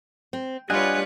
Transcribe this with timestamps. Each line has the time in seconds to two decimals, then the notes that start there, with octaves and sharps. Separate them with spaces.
0.33 C4
0.70 G3 D4 F4 B4 C#5 D#5 F#5 G#5